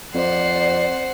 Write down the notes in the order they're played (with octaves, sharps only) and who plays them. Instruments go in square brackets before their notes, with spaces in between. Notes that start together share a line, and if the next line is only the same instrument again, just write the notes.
[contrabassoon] F2 [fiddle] C5 [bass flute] D5 [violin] F#5 C7